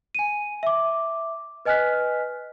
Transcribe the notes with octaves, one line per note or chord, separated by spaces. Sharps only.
G#5 D#7
E5 D6
B4 D#5 G#5 F6 F#6 B6